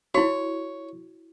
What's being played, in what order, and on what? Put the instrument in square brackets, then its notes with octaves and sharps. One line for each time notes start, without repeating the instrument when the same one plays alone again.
[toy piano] E4 F#4 [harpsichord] C#5